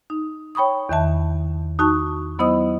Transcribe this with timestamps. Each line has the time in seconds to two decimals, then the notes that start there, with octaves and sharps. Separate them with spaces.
0.10 D#4
0.55 C#5 G5 B5 C#6 D#6
0.89 E2 D#3 E5 A5
1.79 D#4 F#4 A5 C#6
2.39 F#3 B3 E4 C5 D#5 D#6